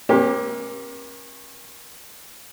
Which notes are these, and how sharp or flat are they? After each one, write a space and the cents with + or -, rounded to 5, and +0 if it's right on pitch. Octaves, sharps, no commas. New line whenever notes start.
A#3 +35 C#4 -35 G4 +0